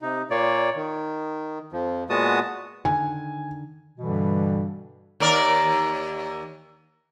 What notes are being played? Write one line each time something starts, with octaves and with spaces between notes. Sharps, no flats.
C3 D#4
A#2 A#3 C#5 D5
D#3
F2 F3
A#2 G#3 B3 F#4 A5 D#6
D3 D#3 G#5
G2 B2 D3 E3 G3
D#2 A#4 D5